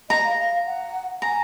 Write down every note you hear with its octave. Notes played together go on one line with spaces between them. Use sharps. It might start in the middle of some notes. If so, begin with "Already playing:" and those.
D#5 A#5
F5
F5
F#5
G#5 A#5